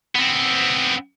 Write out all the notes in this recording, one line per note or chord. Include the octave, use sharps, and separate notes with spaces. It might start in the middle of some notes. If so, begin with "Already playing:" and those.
B3 C4